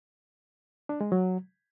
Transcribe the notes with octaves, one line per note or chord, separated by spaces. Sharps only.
D4
G#3
F#3